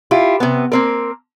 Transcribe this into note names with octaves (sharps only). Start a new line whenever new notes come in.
E4 F4 G4
C3 B3
A#3 C4 A#4